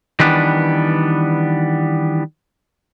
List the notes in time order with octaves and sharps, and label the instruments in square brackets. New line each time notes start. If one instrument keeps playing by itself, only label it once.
[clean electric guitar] D#3 E3 G3 B3 D4